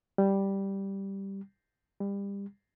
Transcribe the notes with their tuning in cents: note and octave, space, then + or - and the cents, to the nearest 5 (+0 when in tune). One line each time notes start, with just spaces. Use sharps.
G3 -5
G3 +25